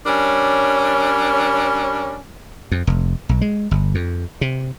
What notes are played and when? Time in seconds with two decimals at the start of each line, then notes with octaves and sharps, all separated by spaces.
0.06 G3 C#4 D4 A#4 C#5
2.72 F2
2.87 F1
3.29 B1
3.41 G#3
3.71 G1
3.95 F2
4.41 C3